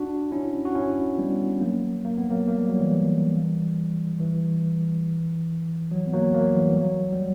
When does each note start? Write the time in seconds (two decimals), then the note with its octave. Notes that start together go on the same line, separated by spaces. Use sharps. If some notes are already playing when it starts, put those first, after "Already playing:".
Already playing: D4 F#4
0.32 C#4 E4
0.65 F#4
0.75 C#4 E4
1.18 G3 B3
1.61 F#3 A#3
2.05 A#3
2.18 B3
2.30 F#3 A#3
2.48 A#3
2.58 G3
2.69 F#3
2.80 E3 G3
4.20 E3
5.91 F#3
6.07 B3
6.14 F#3 A#3
6.34 F#3 A#3
6.56 E3 G3
6.77 F#3
7.12 G3